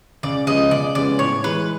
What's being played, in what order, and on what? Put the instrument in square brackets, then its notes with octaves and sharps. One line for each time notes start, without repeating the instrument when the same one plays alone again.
[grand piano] C#2 [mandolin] D5
[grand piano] C#3 F3 G#3 B3 [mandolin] D#5
[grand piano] C#2 [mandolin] D5
[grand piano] C#3 F3 G#3 B3 [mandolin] D5
[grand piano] A2 [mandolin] C#5
[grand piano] E3 G#3 [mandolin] B4